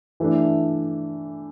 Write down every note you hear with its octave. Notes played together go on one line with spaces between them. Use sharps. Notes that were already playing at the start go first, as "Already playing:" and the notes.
E3 A3 D4